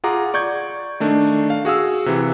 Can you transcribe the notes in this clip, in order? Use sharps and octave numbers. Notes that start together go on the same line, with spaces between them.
F4 G#4 F#5 A#5 D6
D5 C#6 G6 G#6
D#3 A3 D4
F5
F#4 G#4 F5 E6
C3 E3